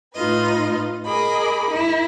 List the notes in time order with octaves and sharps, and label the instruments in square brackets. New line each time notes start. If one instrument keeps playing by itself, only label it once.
[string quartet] A2 D#4 F4 B4 D#5
G#4 A#4 D#5 B5 D6
E4